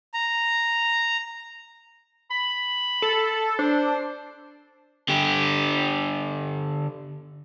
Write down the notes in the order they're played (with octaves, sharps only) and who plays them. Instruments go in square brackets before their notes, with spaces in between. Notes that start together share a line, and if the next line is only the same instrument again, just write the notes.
[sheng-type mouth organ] A#5
[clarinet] B5
[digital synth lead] A4
[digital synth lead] D4 [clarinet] C5
[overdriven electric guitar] D3 G4